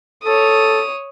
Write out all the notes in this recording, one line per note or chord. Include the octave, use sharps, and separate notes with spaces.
A4 C#5 D#6